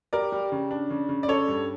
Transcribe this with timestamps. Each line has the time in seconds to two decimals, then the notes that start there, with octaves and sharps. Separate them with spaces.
0.13 G3 A#4 D5
0.32 G3
0.52 C#3
0.71 D4
0.90 C#3
1.09 C#3
1.23 D5
1.28 C#4 A4 C#5
1.48 G2